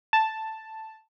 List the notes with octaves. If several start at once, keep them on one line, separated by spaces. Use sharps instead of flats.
A5